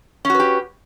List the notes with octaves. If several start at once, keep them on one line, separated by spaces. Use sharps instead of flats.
C#4 F#4 G4 B4